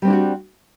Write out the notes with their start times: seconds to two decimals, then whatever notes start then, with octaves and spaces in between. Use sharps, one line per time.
0.02 G3
0.05 C4
0.07 D4
0.10 E4
0.13 F#4